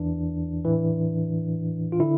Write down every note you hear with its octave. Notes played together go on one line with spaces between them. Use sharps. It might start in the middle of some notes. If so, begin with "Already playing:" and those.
Already playing: E2 E3 D4
A2 E3
F4
D3 E4